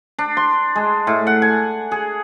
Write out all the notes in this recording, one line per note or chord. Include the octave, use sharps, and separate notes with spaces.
D4
C6
G#3
A2
F#5
G#5
G#4